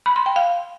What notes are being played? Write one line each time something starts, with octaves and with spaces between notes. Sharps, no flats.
B5
C6
G5
F5